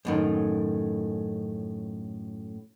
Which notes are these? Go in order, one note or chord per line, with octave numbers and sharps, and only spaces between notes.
F#2 A2 D#3